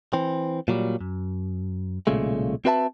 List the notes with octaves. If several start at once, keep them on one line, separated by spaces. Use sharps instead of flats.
E3 C4
A#2 F#3 G3
F#2
B1 A#2 C#3 G#3 A3
C4 F#4 B4 E5 G#5 A5